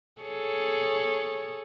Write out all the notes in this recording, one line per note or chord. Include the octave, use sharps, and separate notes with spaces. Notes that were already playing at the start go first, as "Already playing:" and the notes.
G#4 A4 C#5